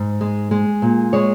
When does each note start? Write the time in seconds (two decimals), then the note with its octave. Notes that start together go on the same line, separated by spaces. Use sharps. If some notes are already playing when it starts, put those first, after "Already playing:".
Already playing: G#2
0.21 G#3
0.51 G#3
0.82 A#2
1.13 G#3 C#5